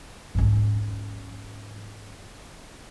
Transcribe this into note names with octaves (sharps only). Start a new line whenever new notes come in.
G#2 C#4